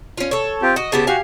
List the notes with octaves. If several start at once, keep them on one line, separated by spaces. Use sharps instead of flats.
C#4 F4
A4 C#5
C4 F4 G4
F#4 D#5
C#3 B3 G4 A5
F#4 G4 F5 G#5